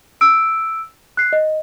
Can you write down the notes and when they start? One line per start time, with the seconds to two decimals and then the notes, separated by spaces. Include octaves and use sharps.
0.21 E6 D7
1.17 F#6 C7
1.33 D#5